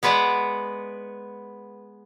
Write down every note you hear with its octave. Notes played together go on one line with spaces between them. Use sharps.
G#3 B3 B4 D5 F#5